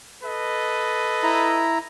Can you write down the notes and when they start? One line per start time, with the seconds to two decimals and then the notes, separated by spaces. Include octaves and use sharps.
0.23 A4 B4 D#5
1.23 E4 A#5